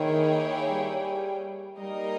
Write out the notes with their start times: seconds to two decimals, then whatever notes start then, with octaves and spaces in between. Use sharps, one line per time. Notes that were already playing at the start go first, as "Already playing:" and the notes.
Already playing: D#3 A#3 E4 G#4 C#5 G5
0.70 G3
1.79 G3 A#3 D#4 A#4 D#5